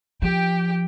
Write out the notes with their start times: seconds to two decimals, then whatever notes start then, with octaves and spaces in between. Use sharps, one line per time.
0.22 F3 G4 G5